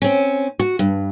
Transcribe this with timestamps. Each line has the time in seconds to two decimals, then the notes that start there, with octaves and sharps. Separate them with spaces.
0.02 C4 C#4
0.59 F#4
0.79 G2